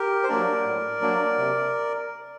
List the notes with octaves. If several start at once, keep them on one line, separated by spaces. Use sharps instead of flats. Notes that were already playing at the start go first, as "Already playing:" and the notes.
Already playing: G4 A#4
C5
F#3 A#3 D4 A#4 D5
A2
F#3 A#3 D4
C3